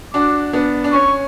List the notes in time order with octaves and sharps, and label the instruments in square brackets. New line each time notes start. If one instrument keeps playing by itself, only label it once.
[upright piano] D4 F#4 [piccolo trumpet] D6
[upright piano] B3 D4
D4
[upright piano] C#4 [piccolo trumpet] C#6